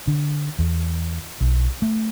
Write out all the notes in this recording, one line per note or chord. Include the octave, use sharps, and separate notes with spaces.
D3
E2
B1
A3